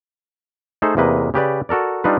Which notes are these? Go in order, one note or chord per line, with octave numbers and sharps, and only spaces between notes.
A3 D#4 G#4 A4 C5
E2 C3 A#3 B4 D#5
C#3 G4 B4 D5
F#4 A4 A#4 D5
G3 D4 D#4 F4 B4